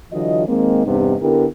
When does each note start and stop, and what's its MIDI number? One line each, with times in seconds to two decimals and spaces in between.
0.11 0.47 50
0.11 0.47 52
0.11 0.47 54
0.11 0.47 65
0.11 0.47 75
0.47 0.85 51
0.47 0.85 56
0.47 0.85 58
0.47 0.85 60
0.85 1.16 40
0.85 1.16 43
0.85 1.16 48
0.85 1.16 59
0.85 1.16 63
1.20 1.45 50
1.20 1.45 59
1.20 1.45 64
1.20 1.45 67
1.20 1.45 70